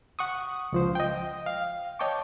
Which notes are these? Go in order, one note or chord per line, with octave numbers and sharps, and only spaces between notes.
F#5 C#6 D#6
C#2 F3 C5
D#5 G5
F5
C#5 D#5 G5 A5 C#6 D6